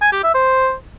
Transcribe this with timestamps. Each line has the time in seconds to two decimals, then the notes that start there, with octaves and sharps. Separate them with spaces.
0.02 G#5
0.13 G4
0.23 E5
0.34 C5